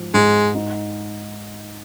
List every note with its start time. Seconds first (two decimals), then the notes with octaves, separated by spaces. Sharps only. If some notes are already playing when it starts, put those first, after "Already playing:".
Already playing: G#2 F3
0.14 G#2 G#3
0.55 D#4